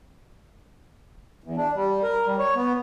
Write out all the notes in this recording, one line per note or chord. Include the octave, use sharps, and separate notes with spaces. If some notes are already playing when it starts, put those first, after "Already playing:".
E2
D4
G3
A#4
G3
C#5
B3